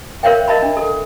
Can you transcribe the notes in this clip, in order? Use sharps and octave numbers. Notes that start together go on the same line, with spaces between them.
A#4 C5 C#5 E5 F5 G5
A#4 D#5 E5 A5 B5
D4
A4